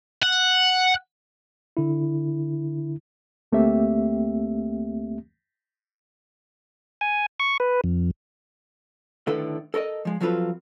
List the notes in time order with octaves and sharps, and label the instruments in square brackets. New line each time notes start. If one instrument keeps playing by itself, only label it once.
[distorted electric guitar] F#5
[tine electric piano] D3 E4
[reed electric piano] D2 A3 A#3 C4 G4 E5
[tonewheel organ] G#5
C#6
B4
F2
[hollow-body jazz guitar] A2 D3 D#3 A4 B4
A4 A#4 C#5 D#5
F3 G#3
F3 F#3 C4 F4 A4 B4